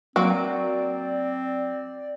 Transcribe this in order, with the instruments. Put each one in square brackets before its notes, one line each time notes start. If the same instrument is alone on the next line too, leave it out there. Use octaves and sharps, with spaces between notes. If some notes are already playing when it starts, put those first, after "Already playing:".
[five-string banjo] F#3 [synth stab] A#3 F#4 D7 [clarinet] C4 [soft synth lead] D5